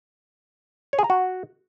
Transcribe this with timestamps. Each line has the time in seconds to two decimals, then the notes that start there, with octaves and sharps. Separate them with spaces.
0.93 C#5
0.99 G#4
1.04 A#5
1.10 F#4